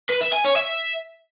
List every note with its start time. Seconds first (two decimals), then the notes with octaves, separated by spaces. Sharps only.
0.10 B4
0.21 E5
0.33 G#5
0.45 C#5
0.56 E5